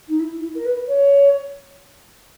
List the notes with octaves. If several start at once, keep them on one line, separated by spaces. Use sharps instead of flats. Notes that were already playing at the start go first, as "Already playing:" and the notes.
D#4
E4
E4
A#4
B4
C#5